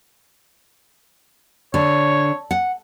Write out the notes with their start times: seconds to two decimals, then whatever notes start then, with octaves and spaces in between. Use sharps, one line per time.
1.74 D3 C#5
2.51 F#5